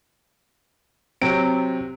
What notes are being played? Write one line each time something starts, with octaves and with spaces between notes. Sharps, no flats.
C3 F#3 C4 D7